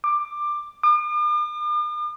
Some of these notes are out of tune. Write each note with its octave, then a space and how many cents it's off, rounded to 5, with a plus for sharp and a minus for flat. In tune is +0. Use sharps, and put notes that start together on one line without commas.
D6 +15
D6 +45